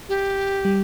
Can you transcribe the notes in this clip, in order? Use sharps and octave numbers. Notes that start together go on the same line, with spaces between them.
G4
G3